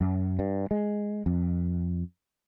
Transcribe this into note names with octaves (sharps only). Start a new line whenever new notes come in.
F#2
G2
G#3
F2